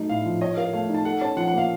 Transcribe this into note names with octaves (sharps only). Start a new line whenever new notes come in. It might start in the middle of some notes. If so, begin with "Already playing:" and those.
Already playing: F#3 A3 D#4
A2 F5
F3
C#5 D#5
A#4 F5
A3 F5
D#4
A5
A4 F#5
C#4 A5
F3 F#5
F#5
A#3 F5